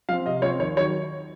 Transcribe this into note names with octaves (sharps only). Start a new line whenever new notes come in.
F3 C4 F5
C3 D#5
F3 C4 C#5
D#2 C#5
D#3 F#3 C#5